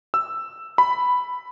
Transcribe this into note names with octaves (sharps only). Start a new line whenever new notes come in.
E6
B5